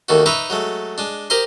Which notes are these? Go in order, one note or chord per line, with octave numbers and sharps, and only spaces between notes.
D#2 D#3 A3 F#4
D#4 B4 E5 A#5 C#6 D6
F#3 G#3 A3
G#3 D4
G4 A#4 C5 D#5 C6